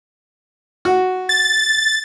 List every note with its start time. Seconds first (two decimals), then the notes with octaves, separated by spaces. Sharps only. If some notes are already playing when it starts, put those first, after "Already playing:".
0.85 F#4
1.29 A6